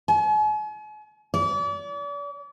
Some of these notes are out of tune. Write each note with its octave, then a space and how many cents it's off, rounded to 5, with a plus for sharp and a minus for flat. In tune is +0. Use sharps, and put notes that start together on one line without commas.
G#5 +40
D5 -40